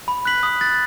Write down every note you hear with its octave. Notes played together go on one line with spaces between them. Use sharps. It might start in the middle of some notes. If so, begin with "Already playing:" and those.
B5
F#6 B6 F#7
D#6
F#6 A6